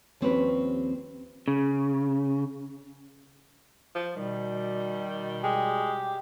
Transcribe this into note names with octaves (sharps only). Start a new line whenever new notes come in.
D#2 F3 C4 C#4 G4 B4
C#3
F3
B2 D#3 G3
G#3 G4